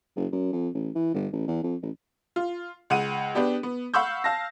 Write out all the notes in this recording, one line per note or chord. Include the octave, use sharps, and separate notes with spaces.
F#1
F#2
F2
A1
E3
G1
A1
E2
F2
A1
F4
C#2 F#5 D#7
B3 D4 G4
B3
F5 F#5 B5 C#6 E6 G6
F5 A5 A#6